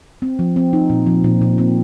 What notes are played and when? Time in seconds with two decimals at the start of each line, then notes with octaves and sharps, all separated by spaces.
0.22 C4
0.39 F3
0.56 C4
0.73 D#4
0.90 A#2
1.06 F3
1.24 A#2
1.42 A#2
1.58 C4